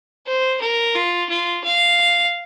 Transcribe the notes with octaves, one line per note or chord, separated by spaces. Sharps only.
C5
A#4
F4
F4
F5